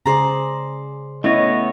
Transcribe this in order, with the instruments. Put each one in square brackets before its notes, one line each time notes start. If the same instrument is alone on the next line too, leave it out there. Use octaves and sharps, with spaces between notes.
[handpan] C#3 G#4 [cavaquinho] C5 D5 A#5
[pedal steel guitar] A3 B3 C#5 [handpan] C#4 E4 [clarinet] D#5